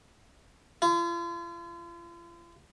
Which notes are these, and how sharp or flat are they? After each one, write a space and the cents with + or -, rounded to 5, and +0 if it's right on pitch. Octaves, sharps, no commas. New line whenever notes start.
F4 -40